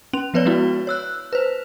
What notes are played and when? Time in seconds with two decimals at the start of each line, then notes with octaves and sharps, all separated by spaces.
0.13 C#4 F7
0.34 F3 B3 B4 C#5 D5
0.45 G#3 B3 E4 F#4
0.87 C#5 E6 F#6
1.33 B4 C5